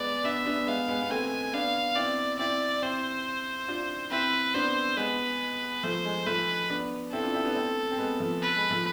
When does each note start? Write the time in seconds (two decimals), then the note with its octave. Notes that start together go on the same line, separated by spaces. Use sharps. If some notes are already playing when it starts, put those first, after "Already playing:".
Already playing: G#3 B3 D5
0.24 B3 D4 E5
0.46 B3 D4
0.67 G#3 B3 F5
0.88 G#3 B3
1.03 B3
1.10 A3 C4 G#5
1.53 B3 D4 F5
1.96 C4 E4 D5
2.39 C4 E4 D5
2.82 C4 E4 C5
3.68 D4 F4
4.11 C4 E4 B4
4.54 B3 D4 C5
4.97 G#3 B3 B4
5.83 F3 A3 C5
6.05 G#3
6.26 F3 A3 B4
6.70 B3 D4
7.13 C4 E4 A4
7.23 D4 F4
7.34 C4 E4
7.45 B3 D4
7.56 A3 C4
7.91 C4
7.98 G#3 B3
8.20 F3 A3
8.42 B4
8.56 G#3
8.71 F3 A3